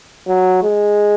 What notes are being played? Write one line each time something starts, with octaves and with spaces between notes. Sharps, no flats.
F#3
G#3